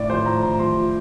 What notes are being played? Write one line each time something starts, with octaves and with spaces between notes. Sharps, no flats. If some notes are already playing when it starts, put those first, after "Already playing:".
Already playing: A2 D5
F3 C5
A2 A#5
A2 A#5
F3 C6
F3